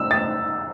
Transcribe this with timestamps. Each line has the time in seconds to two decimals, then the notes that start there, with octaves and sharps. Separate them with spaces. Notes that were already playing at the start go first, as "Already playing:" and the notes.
Already playing: E6
0.11 A6